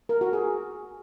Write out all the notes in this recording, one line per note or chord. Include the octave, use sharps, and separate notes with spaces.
A#4
F#4
G#4